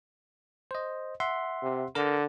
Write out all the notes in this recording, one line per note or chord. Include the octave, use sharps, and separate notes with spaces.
C5 D#5
E5 F#5 C6
C3
D3 A#4 A#5